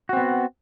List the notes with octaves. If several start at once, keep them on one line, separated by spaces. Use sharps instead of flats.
B3 C4 F#4